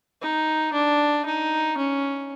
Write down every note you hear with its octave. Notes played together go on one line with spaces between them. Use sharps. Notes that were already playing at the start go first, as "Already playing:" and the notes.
D#4
D4
D#4
C#4